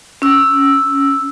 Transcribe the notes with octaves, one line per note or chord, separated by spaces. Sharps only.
C#4 E6